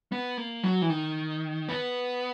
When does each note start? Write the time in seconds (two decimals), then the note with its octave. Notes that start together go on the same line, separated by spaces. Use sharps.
0.12 B3
0.37 A#3
0.64 F#3
0.82 E3
0.90 D#3
1.69 B3